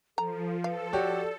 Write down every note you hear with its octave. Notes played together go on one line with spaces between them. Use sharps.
F3 A4 A#5
A4 B4 F5
F#4 G4 C#5 D5